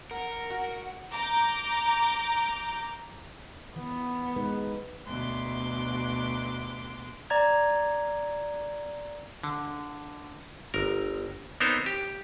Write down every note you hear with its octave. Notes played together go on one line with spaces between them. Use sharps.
A#4 F#5
F#4
A#5 D6 G6
E3 B3
G#3 D#4 B4
D2 B2 C6 D6 F#6
D5 A#5 G#6
D3
G1 A#4
B3 C4 D#4 A#4 C5 C#5
G4